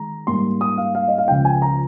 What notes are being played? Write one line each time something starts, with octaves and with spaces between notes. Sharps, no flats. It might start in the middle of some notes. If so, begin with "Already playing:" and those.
Already playing: D#3 G#3 A#5
G#2 G3 A#3 C6
D#6
F5
F5
D#5
F5
C#2 C#3 F3 G5
G#5
A#5